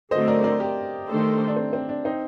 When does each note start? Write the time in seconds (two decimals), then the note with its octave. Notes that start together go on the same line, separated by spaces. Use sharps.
0.11 D3 F#3 A3 C4 C5 D#5
0.28 A#4 D5
0.44 A#4 D5
0.59 G4 A#4
1.08 D#3 A3 D4 A4 C5
1.48 D4
1.56 C4
1.73 C4
1.89 D4
2.05 C4 D#4